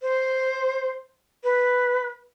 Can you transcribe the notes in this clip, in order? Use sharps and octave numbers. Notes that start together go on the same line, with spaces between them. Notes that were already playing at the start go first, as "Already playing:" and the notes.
C5
B4